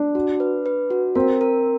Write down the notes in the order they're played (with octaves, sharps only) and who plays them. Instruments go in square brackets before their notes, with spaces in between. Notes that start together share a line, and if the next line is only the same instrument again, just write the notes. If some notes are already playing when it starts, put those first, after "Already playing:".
Already playing: [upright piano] D4
[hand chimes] F#4
B4
B4
F#4
[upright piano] C4 [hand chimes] A#4
[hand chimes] A#4